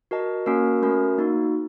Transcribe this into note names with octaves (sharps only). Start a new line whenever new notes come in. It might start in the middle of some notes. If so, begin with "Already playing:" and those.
F#4 A#4 D#5 A5
A#3 C#4 F#4 A#4
A3 C#4 F#4 A#4
A#3 D#4 F#4